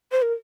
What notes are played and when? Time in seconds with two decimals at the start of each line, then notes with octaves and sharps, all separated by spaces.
0.12 C5
0.22 A#4